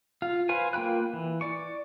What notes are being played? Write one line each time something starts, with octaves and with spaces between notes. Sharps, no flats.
F4 F5
B4 C5 F5 G#5
A#3 F4 G5 B5 F#6
E3
D5 C#6